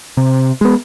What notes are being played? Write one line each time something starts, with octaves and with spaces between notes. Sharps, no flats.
C3
G#3 B3